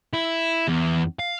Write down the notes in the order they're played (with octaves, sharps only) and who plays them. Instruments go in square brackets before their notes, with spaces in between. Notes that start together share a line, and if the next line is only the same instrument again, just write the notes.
[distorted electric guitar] E4
E2
F5